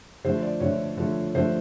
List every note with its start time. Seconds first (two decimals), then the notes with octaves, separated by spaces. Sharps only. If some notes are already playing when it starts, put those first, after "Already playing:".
0.24 D3 F3 A3 C5
0.42 D5
0.60 D3 F3 A3 C#5
0.97 D3 F3 A3
1.35 D3 F3 A3 C5